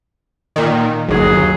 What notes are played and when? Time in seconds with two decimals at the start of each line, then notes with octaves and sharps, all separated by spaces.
0.56 A#2 D#3
1.08 G1 D#2 F#3 G#4